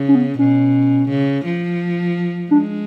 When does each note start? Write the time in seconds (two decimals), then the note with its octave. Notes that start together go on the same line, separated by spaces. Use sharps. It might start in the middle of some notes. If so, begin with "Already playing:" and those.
Already playing: C#3
0.08 C#4
0.15 B3
0.39 B2 C#4
1.09 C#3
1.45 F3
2.50 G#3 D4